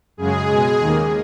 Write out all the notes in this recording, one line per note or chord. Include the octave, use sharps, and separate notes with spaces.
F#2 C#3 G#3 G#4
B2 G#3
D#2 D#3 A#3